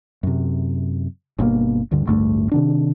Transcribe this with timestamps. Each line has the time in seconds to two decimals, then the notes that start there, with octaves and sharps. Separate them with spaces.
0.23 F#2 C3
1.38 G1 B2 D3 A#3
1.91 D2 G2 D3
2.06 A1 D2 G2 A3
2.51 C3 D#3 D4